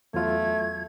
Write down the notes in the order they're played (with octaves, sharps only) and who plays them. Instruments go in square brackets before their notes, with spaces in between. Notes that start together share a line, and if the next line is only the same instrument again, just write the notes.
[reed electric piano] E2 F#3 F4 [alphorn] A3 [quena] G#6